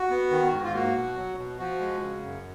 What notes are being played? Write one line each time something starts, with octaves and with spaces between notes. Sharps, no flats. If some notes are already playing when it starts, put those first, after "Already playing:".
Already playing: F#4
B3
D#3
G#2
F4
A#3 F#4
B2
F#3
B2
F3 F#4
G#3
C#3
F#2